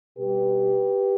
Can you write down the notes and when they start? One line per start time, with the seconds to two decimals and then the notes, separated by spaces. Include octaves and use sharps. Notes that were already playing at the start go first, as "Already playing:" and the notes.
0.16 B2 G3 G4 B4